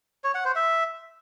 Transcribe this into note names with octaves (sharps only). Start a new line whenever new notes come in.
C#5
F#5
C5
E5